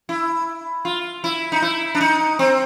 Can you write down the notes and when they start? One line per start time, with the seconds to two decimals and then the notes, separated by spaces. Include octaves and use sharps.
0.09 E4
0.85 F4
1.24 E4
1.52 D#4
1.62 E4
1.95 D4
2.01 D#4
2.39 C4